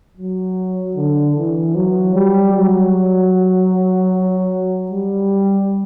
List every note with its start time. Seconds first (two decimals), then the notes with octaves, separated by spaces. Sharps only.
0.17 F#3
0.96 D3
1.36 E3
1.75 F#3
2.15 G3
2.54 F#3
4.92 G3